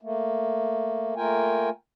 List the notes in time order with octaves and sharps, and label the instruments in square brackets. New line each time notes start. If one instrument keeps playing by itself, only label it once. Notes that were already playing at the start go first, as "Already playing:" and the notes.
[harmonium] A3 A#3
A3 A#3 F4 A#4 G5 G#5